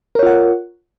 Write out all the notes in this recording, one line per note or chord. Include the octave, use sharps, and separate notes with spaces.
F4 A#4 C#5 F#5